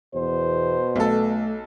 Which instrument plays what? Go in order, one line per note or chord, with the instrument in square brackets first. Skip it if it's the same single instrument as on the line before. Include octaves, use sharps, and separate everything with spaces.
[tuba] E2 [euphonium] B2 [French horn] C5
[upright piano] B1 A4 [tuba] A3